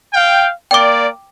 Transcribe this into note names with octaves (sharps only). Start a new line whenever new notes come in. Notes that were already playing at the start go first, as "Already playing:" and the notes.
F5 G5
A#3 D5 G5 D6